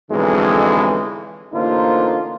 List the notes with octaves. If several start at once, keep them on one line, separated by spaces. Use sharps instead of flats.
B1 F2 D3 E3 G#3
A1 D3 A#3 D#4 F4 C5